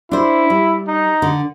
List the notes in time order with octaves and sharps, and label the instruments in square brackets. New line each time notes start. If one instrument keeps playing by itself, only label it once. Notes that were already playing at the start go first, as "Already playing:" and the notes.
[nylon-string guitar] D4 C5 [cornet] E4
[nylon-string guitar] G3
[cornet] D#4
[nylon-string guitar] D3